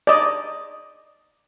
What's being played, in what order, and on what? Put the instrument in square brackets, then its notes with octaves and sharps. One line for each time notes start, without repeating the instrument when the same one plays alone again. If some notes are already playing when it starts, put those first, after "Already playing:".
[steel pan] D5 D#5